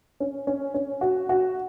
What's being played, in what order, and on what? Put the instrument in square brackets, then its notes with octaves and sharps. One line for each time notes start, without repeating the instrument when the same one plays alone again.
[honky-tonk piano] C#4
C#4
C#4
F#4
F#4